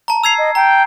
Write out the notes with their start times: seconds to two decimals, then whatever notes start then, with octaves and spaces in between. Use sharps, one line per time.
0.08 A5 A#5
0.24 E6 G#6 C7 F7
0.38 D#5
0.55 G5 A#5